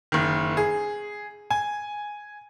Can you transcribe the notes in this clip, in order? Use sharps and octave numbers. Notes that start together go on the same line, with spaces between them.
F#1 D#3
G#4
G#5